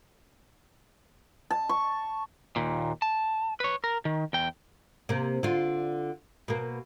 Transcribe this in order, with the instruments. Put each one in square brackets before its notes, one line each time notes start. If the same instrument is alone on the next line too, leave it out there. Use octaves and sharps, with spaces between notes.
[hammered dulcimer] A5
C#6
[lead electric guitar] D#2 A#2
A5
B4 C#5
A#4
D#3
E2 G5
[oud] C3 A#3
D3 F4
B2 A#3